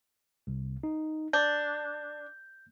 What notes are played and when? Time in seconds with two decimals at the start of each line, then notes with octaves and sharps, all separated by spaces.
0.47 C2 C3
0.83 D#4
1.33 D4 G6